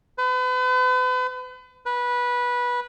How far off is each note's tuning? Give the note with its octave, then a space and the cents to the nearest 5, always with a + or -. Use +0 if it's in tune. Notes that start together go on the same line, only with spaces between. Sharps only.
B4 +40
B4 -15